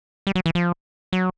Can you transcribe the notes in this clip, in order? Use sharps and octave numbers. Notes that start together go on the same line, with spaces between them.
G3
F#3
E3
F3
F#3